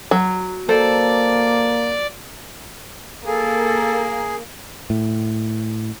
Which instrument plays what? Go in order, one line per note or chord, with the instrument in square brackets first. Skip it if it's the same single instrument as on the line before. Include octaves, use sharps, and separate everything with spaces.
[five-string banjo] F#3
[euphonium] A#3 [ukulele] A4 C5 [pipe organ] D5
[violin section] A#3 [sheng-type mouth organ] G#4 [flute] A4
[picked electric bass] A2